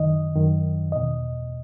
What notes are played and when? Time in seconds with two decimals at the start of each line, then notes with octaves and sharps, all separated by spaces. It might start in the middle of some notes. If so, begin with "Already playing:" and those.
Already playing: F#2 D#3 D#5
0.35 F#2 D#3
0.92 E2 B2 D#5